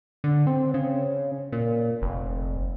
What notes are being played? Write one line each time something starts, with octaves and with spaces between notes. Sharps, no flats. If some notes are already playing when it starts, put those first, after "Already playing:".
D3
C4
C#3
A#2
F1